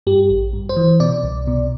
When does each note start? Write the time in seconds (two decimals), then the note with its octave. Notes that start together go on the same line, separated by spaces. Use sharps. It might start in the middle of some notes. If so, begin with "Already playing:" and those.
0.07 G2 G4
0.29 A1
0.53 G2
0.69 C5
0.76 E3
1.00 B2 D5
1.23 C2
1.47 B2